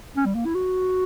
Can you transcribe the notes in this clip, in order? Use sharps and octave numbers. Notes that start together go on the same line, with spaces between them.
C#4
G3
A#3
E4
F#4